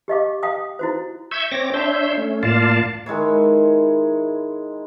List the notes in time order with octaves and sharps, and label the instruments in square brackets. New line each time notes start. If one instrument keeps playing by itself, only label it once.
[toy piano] G4 D#5 F5 D6
F5 G5 D#6
E4 F#4 C5
[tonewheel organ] E5 C#6 E6 G6 G#6
C4 C#5 D6 A#6
D4 C#5 E5 C6 E6 G6
A3 C#4
A2 A#3 F4 D5 F5 A5
[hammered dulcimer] D#3 G#3 E4 C#5